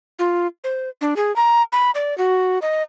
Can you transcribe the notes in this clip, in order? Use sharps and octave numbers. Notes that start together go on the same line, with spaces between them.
F4
C5
D4
G#4
A#5
B5
D5
F#4
D#5